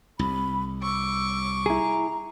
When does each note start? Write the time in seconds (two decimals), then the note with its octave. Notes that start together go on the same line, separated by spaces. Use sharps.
0.19 C2 B5
0.83 C#6 D6 E6
1.66 E4 G#4 A#5